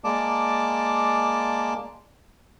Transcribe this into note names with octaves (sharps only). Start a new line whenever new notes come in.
G#3 A#3 D5 A5 D6